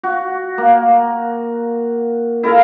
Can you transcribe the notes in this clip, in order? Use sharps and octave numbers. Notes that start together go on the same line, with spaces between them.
F#4
A#3
E4 A4 A#4 F5